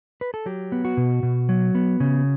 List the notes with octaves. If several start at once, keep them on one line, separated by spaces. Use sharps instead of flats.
B4
A4
F#3 G4
B3
F#4
B2
B2
F#3
B3
C#3